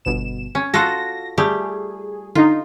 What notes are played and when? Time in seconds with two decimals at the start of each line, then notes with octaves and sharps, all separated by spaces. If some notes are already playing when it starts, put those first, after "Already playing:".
0.05 G1 B2 E7
0.55 C#4
0.74 F4 F#4 A4 A#6
1.38 G3 A3 G4 G#4
2.35 D3 D#4 F4